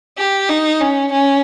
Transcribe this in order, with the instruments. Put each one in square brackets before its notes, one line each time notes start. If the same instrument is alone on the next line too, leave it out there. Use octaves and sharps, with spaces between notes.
[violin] G4
D#4
C#4
C#4